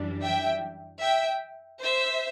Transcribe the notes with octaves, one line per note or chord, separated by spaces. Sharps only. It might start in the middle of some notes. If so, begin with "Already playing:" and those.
Already playing: F#2 E3 G3 D4
E5 G5
E5 G5
C5 E5